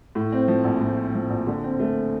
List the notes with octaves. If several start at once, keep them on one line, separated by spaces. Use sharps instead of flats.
A2
C4
F3
A#1
A2
C4
F3
A#1
D3
C4
A3